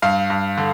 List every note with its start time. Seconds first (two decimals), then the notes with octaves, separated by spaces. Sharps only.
0.02 G2 F5
0.30 G2
0.58 D3